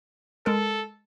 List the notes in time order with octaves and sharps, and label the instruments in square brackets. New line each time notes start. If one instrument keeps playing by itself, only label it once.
[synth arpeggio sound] G#3 A#4 [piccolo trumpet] A4